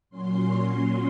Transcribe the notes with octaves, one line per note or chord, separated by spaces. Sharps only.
A#2 F#3 C#4 C6